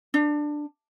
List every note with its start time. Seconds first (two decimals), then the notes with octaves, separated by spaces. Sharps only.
0.14 D4